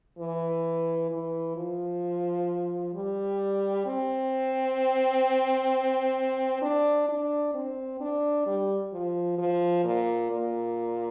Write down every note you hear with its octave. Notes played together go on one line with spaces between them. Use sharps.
E3
E3
F3
G3
C4
D4
D4
C4
D4
G3
F3
F3
A#2
A#2